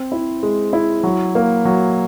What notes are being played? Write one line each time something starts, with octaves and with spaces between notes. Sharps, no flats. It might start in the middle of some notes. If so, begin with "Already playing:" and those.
Already playing: C4
E4
G#3
E4
F#3
A#3
F#3